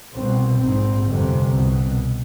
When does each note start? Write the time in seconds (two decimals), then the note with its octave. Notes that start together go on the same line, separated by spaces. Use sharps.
0.14 C2 B2 C4
0.60 A#1 G#2 C4
1.05 G1 F2 C3
1.50 C2 B2